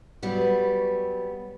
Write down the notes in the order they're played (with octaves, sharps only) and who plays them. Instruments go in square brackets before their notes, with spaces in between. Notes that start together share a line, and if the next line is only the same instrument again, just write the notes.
[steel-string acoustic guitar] F#3 G3 B3